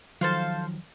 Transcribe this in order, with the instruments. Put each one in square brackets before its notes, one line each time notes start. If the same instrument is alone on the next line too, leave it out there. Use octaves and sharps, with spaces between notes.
[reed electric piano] D#3 F3 F#3 [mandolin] A4 C5 F5